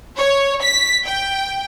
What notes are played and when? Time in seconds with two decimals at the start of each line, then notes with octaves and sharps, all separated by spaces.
0.17 C#5
0.62 B6
1.04 G5